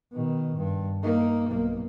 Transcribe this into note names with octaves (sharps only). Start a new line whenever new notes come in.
B2 D#3
G2
A#3 D#4
B1 A#3